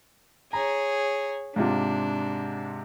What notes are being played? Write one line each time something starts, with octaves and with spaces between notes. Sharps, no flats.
G#4 C#5 A#5
G#2 C3 D4 F4